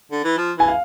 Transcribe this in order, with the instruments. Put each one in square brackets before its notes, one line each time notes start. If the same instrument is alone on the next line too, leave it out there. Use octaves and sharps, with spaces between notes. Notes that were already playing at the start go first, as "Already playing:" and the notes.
[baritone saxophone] D3
E3
F3
[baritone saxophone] E3 [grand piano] G#5
[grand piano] F5